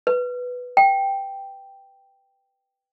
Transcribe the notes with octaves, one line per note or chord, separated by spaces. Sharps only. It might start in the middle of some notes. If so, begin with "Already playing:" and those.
B4
G5